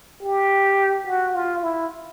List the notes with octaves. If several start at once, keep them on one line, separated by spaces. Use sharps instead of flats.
G4
F#4
F4
E4